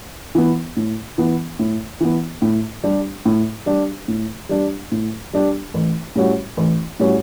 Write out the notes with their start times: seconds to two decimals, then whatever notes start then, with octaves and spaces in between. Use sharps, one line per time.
0.35 E3 B3
0.77 A2
1.18 E3 B3
1.59 A2
2.01 E3 B3
2.42 A2
2.83 G3 D4 G4
3.25 A2
3.66 G3 D4 G4
4.08 A2
4.49 G3 D4 G4
4.92 A2
5.33 G3 D4 G4
5.74 A1
6.16 A2 G3 C#4 F#4
6.57 A1
7.00 A2 G3 C#4 F#4